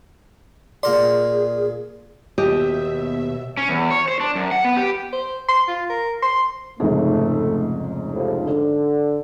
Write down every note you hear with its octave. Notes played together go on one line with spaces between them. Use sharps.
A#2 G#4 A#4 D5 C6
D#2 B2 G4 D#5 E5
C#4
E2
C#5
C5
D4
F#2
F#5
B3
G4
C5
C6
F4
A#4
C6
F1 C#2 G#2 A3
A2 C3 F3
D3